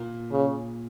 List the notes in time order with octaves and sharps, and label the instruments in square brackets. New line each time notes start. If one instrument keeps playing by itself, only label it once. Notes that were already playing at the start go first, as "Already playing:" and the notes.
Already playing: [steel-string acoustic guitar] A#2
[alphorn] C#3